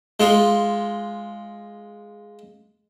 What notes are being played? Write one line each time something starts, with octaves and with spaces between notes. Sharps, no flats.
G#3 F4